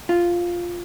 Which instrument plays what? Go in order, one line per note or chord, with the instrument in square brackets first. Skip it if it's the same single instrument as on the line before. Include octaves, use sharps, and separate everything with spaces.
[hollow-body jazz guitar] F4